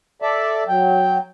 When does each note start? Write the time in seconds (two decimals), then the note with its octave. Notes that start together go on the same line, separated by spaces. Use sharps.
0.22 A4 D5 E5
0.68 F#3 G5